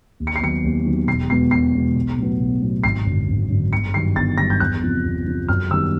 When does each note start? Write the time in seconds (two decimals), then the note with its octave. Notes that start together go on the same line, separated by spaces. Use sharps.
0.20 D#2
0.27 C#7
0.36 C7
0.41 D#3 F#3 B3 C#7
0.64 D#2
0.86 D#3 F#3 B3
1.07 E1 C7
1.30 E2 B2 G#3 B3 C7
1.51 E1 C7
1.74 E2 B2 G#3 B3
1.95 B1
2.17 A2 F#3 B3
2.40 B1
2.62 A2 F#3 B3
2.84 G#1 C7
3.06 F#2 D3
3.27 G#1
3.49 F#2 D3
3.72 G1 C#7
3.94 G2 D#3 F#3 C7
4.16 G1 A6
4.38 G2 D#3 F#3 A#6
4.50 G6
4.60 E2 F#6
4.83 C3 F3
5.05 E2
5.26 C3 F3
5.48 F#2 F6
5.70 D#3 G3 B3 E6